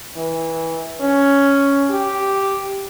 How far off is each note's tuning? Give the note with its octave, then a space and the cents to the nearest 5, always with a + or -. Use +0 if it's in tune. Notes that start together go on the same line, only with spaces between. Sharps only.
E3 -15
C#4 +5
G4 -5